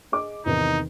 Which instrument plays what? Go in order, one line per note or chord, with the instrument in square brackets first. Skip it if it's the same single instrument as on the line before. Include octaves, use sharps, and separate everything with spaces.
[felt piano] G#4 D#5 D6
[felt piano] E2 C3 D#3 [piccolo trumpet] D#4